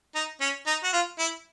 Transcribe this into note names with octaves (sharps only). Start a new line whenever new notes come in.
D#4
C#4
D#4
F#4
F4
E4